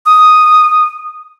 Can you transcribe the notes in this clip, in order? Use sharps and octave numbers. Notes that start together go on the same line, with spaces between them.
D#6